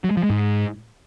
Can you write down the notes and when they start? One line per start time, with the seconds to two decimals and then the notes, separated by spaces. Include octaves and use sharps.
0.04 F#3
0.11 G#3
0.17 F3
0.23 G#3
0.30 G#2